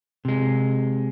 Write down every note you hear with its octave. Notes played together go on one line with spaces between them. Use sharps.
C3 G#3